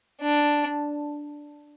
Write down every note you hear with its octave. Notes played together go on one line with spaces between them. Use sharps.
D4